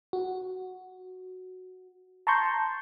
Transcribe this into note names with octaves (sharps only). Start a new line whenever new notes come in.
F#4
A5 A#5 C6 C#6 G6